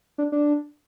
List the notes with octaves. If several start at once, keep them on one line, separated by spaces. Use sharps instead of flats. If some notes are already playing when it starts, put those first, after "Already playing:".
D4
D4